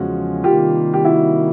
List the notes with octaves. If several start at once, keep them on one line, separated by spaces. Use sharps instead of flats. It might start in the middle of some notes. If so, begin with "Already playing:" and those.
Already playing: E2 C#3 F3 G#3 C#4 F#4
C3 D#3 G3 A#3 F4 G4
G4
E4 F#4